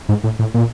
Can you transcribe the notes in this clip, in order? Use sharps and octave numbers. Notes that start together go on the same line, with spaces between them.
G#2
A2
A2
A#2